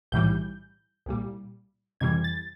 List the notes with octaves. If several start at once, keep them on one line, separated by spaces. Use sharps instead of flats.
B1 A2 E3 G3 G6
C2 A#2 G3
F2 C3 E3 G3 G#6
A6